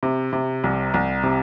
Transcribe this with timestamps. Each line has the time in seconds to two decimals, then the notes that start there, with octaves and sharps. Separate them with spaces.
0.03 C3
0.33 C3
0.64 C2
0.94 C2
1.23 C3